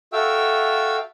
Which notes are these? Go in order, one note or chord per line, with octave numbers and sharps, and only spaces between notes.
F#4 A4 E5 F5 G5 E6